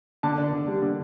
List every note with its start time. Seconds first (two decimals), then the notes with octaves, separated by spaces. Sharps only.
0.23 D3 A5
0.38 D4
0.53 D3
0.67 G3
0.82 D3